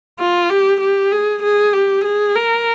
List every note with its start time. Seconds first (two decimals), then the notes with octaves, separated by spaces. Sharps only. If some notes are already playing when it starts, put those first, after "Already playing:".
0.20 F4
0.50 G4
0.81 G4
1.12 G#4
1.43 G#4
1.73 G4
2.05 G#4
2.36 A#4